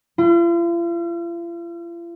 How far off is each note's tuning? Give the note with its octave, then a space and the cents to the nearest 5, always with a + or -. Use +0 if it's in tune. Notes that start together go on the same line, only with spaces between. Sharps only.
F4 -45